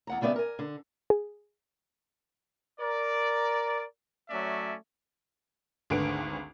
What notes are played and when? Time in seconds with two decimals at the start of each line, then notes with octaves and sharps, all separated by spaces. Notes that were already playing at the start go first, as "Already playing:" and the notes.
0.07 E2 F#5 A#5
0.21 C#3 G3 B3 D5 E5
0.36 A#4 G#5
0.59 D3
1.10 G#4
2.80 A#4 D5
4.30 F#3 A3 C#4 D5 E5
5.90 G#1 D2 D3 B4 D7